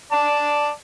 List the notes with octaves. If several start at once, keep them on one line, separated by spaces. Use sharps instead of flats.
D5 A5